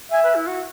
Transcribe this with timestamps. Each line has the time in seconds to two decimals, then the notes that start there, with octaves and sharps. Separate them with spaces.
0.11 E5 G#5
0.24 B4
0.35 E4
0.47 F#4